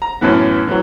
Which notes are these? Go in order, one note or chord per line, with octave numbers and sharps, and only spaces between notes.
A#5
F#2 A2 E3 B3
E3 F#3